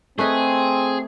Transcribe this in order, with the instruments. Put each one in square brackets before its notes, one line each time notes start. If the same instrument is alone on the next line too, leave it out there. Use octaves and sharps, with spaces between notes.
[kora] A3 B4 D#5 [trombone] C4 [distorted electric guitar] G#4